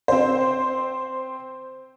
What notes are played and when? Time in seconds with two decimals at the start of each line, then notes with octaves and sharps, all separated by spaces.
0.08 C4 C5